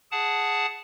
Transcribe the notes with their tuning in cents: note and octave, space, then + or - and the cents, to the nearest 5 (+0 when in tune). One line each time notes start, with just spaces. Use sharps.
G#4 +0 F#5 +0 A5 -5